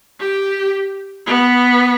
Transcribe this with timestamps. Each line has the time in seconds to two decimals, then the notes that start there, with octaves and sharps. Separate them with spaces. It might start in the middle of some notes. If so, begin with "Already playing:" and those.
0.20 G4
1.27 B3